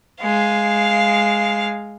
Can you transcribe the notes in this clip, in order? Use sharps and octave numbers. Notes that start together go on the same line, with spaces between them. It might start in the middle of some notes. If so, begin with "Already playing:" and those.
G#3 F5